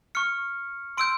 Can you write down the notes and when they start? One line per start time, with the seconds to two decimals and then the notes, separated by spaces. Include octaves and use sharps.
0.15 C#6 F6 C#7
0.97 C6 E6 G6 D7